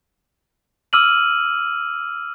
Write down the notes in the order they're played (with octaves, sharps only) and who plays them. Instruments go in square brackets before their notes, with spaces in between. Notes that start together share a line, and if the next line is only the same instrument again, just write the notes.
[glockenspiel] D6 E6 F6 D#7 F#7